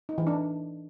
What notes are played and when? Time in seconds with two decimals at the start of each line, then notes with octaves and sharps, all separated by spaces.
0.09 D#4
0.18 E3
0.27 D4